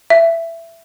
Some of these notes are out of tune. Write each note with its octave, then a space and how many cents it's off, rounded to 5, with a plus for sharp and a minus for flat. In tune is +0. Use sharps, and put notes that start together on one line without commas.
E5 +15